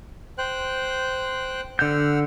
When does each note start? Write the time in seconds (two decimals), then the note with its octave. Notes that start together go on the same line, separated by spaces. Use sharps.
0.38 C5 G5 F#6
1.79 D3 F#5 E6 F6 G6